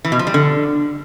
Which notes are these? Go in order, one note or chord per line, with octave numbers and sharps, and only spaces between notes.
E3
B2
F3
G3
D3